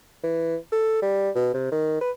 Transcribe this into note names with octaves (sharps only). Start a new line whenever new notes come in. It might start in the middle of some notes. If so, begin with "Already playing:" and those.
E3
A4
G3
B2
C3
D#3
B4